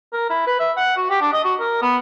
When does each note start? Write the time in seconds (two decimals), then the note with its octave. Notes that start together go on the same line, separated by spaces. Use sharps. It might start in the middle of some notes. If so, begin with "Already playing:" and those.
0.13 A#4
0.30 E4
0.47 B4
0.60 E5
0.77 F#5
0.97 F#4
1.10 G4
1.21 D4
1.33 D#5
1.44 F#4
1.60 A#4
1.82 B3